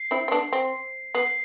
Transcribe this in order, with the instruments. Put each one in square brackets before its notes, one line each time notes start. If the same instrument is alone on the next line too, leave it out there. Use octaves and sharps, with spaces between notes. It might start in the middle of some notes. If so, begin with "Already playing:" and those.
Already playing: [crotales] C7
[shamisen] C4 E4
C4
B3 D4
C4
[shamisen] B3 [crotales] C7